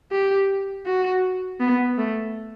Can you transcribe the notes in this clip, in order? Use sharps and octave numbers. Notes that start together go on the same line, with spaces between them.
G4
F#4
B3
A3